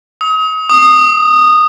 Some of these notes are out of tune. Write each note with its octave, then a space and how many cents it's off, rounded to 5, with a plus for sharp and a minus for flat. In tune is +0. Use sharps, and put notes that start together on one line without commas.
D#6 +35
D#6 -15